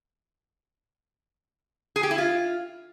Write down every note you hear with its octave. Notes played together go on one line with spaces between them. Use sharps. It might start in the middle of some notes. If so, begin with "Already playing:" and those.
G#4
G4
E4
F4